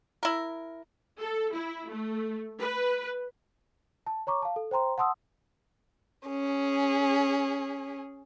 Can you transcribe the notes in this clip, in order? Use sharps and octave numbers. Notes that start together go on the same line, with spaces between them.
E4 A#4
A4
E4
A3
B4
A5
C#5 A#5 C#6 D6
F5 A5
A4
C5 G5 A#5 C6
F#5 A5 C6 D#6 E6
C#4 G#4